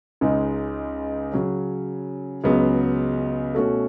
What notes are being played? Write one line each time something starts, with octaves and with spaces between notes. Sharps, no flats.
C#2 C#3 G#3 D#4
C#3 F#3 C#4
C#2 C#3 F#3 B3
B2 A3 C#4 F#4 A4